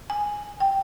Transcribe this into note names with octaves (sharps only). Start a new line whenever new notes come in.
G#5
G5